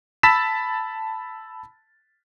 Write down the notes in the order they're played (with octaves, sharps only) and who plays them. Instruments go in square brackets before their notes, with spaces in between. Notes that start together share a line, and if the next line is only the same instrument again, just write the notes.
[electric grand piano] A5 B5 E6 A6 B6 E7